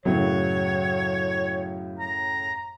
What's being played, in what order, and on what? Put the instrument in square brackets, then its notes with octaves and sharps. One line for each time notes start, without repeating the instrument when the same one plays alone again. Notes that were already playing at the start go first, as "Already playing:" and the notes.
[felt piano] F#2 A2 C#3 [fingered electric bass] F#3 [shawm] C#5
[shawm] A#5